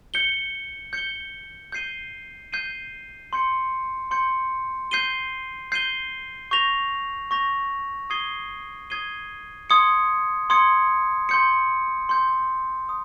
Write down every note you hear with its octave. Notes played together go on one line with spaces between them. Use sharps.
G6 C#7 G7
G6 C#7 G7
G6 C7 D#7 G7
G6 C7 D#7 G7
C6 G6 C#7
C6 G6 C#7
G6 C7 D#7 G7
G6 C7 D#7 G7
C#6 G6 A#6 F7
C#6 G6 A#6 F7
D#6 G#6 C7 D#7 G7
D#6 G#6 C7 D#7 G7
C6 D#6 G#6 C#7
C6 D#6 G#6 C#7
C6 G6 C#7
C6 G6 C#7
D#6